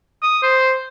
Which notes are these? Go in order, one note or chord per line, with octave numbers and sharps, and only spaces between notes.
D#6
C5